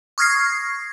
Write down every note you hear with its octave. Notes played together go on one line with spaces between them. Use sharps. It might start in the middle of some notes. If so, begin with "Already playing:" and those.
C#6 D#6 F6 G#6 A#6 C7